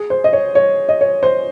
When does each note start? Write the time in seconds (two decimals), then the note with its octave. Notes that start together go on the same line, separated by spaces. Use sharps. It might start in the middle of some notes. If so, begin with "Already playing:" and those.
Already playing: G#4
0.10 C5
0.24 D#5
0.33 C#5
0.55 C#5
0.89 D#5
1.01 C#5
1.23 C5